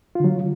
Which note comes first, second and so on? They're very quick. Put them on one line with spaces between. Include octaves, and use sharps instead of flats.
F4 D3 F#3